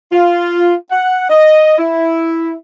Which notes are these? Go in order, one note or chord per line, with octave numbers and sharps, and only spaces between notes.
F4
F#5
D#5
E4